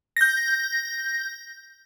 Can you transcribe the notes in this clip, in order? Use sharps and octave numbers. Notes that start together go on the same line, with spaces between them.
G6 A#6